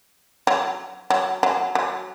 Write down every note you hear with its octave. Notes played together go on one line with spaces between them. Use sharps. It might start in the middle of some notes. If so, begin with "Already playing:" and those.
F#3
F#3
F#3
F#3